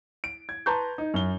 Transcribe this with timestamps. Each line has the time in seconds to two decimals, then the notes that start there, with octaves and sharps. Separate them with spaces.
0.24 D7
0.49 G#6
0.66 B4 A5 A#5 C6 C#6 G6
0.98 D#4
1.14 F#2 G7